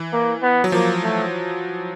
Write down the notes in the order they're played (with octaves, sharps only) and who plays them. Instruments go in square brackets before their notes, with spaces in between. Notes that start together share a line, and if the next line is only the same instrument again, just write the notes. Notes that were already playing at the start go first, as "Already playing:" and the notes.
Already playing: [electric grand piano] E3
[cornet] A#3
B3
[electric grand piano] F#3
[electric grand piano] F3 [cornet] A#3
[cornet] A3